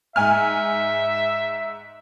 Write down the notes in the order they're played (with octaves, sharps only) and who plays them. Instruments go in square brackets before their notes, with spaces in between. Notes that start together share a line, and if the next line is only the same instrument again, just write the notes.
[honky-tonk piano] G#2 G#5 F6 [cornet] E5